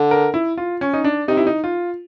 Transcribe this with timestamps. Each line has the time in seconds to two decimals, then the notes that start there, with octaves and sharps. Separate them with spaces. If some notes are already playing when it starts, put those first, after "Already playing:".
Already playing: D3
0.11 A#4
0.34 E4
0.57 F4
0.81 C#4
0.93 D#4
1.04 D4
1.28 C3 D#4
1.37 E4
1.47 D#4
1.64 F4